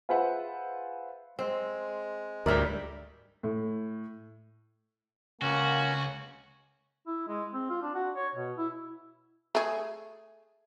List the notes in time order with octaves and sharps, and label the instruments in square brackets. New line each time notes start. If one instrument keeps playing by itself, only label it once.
[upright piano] F4 G#4 B4 C5 E5 F#5
[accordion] G#3 [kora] C4
[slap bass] D2 G#2 [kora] G3 D5 [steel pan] A#4 E5
[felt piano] A2
[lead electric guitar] C#2 [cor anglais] A#3 [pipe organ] C#4 [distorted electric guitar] F#4
[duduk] E4
G#3
C4
F4
D4
F#4
C#5
B2
E4
[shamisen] A3 G#4